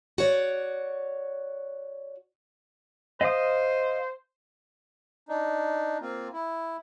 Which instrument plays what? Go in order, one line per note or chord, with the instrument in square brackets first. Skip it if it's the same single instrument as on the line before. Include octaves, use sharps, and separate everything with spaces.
[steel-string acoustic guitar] F#4 C#5 D5
[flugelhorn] C5 [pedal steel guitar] D#5 F5 D#6
[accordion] D4 D#4
A#3 C4 F4
E4